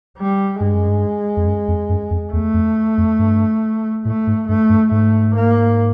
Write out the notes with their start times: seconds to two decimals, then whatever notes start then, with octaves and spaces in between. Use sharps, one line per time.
0.18 G3
0.60 G2 G#3
0.74 F#2
0.88 G2
1.37 F2
1.47 F#2
1.68 F2
1.89 F#2
2.11 F2
2.32 E2 A3
2.54 F2
2.98 F2
3.19 G2
4.05 A2 A3
4.27 G#2
4.48 G2 A3
4.69 G2
4.91 G#2 A3
5.35 A#3